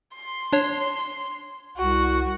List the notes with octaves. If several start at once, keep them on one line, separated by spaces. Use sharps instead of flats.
C6
D4 C#5
C2 F#4